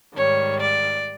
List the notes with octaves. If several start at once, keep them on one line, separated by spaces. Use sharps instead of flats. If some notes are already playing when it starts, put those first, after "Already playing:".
G#2 D#3 G3 C#5
D5